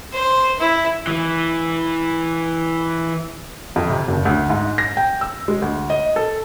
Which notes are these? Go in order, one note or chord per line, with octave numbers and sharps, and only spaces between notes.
C5
E4
E3 E4
F2
C3
F#1
D2
G#2
A#6
G5
E6
G#3
D2
D#5
A4